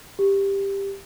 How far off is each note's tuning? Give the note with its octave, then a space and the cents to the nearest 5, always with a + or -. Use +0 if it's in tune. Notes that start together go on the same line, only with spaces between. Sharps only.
G4 +10